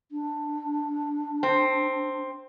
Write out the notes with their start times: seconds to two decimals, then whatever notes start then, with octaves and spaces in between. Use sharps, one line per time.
0.12 D4
1.43 C4